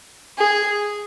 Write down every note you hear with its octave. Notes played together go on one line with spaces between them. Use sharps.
G#4